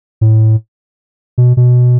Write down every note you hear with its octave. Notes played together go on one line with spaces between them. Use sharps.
A2
B2
B2